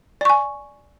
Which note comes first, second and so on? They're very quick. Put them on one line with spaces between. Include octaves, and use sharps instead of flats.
D5 C#6 G#5